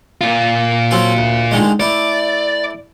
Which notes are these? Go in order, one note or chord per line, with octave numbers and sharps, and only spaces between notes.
A#2 F4
F#3 C4 A4
D2
D3 D#3 G#3
A3 E4 D5